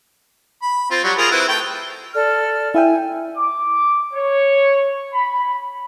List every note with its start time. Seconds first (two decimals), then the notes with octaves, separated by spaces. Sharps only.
0.62 B5
0.91 C4 F4
1.04 F#3 G3 F#4
1.18 F4 G#4 A#4
1.31 C4 E4 B4
1.49 A3 G5
2.14 A4 D5 F6
2.74 E4 E5 G5 G#5
3.36 D6
4.14 C#5
5.13 B5